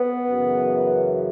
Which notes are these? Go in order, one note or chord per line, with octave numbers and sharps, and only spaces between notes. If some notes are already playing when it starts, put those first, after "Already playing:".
Already playing: B3
F#2 C#3 E3